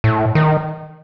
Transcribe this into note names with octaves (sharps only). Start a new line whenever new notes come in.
A2
D#3